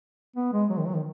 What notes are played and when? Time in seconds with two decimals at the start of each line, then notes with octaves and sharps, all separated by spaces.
0.36 B3
0.53 G#3
0.70 F#3
0.78 D#3
0.86 F#3
0.94 D#3